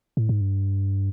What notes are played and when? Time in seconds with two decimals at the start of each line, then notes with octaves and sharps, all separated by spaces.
0.17 A2
0.29 G#2
0.41 G2